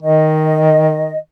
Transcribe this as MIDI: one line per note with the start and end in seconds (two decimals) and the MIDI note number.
0.03 1.19 51
0.03 1.17 75